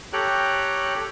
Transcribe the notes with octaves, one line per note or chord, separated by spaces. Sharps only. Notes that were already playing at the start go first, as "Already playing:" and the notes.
G4 A4 C#5 G5 A#5 F#6